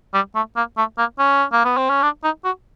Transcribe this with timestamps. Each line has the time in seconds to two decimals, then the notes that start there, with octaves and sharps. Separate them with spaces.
0.14 G3
0.35 A3
0.56 A#3
0.77 A3
0.98 A#3
1.19 C#4
1.52 A#3
1.65 B3
1.77 C4
1.89 C#4
2.02 D4
2.24 D#4
2.44 F#4